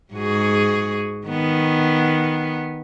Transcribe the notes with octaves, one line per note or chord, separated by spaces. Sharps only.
G#2 F#4 G#4
D#3 B3